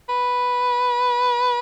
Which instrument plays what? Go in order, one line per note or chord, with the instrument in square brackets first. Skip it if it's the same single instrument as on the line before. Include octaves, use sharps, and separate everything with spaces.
[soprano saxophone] B4